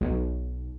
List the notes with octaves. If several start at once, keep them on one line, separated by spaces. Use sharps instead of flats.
B1